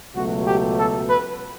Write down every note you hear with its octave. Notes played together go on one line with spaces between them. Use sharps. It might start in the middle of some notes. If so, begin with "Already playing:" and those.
C#2 B2 F#3 A3 F#4
G4
A4
B4